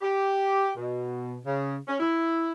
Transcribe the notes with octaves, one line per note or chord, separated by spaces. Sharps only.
G4
B2
C#3
C#4
E4